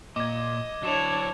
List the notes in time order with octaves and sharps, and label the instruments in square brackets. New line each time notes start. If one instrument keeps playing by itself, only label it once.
[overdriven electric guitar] A#2 [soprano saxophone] D#5 [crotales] D6 G#6
[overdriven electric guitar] F#3 E4 [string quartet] D4 C#5 [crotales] D6 E7 F7